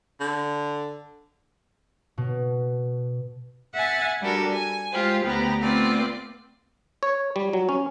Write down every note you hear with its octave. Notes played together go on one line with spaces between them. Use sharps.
D3
B2
E5 F#5 G#5 A6
G3 D4 F#4 A4 A#4
G#5
G#3 F4 G4 C5
D2 B3 G4 A#5
A3 B3 C4 F4 D5
C#5
G3
F#3
C#4